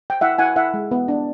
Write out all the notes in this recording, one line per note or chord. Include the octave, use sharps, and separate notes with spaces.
G5
E4 E5 F#5
E4 F#5 G#5
E4 E5 F#5
G#3
B3
D4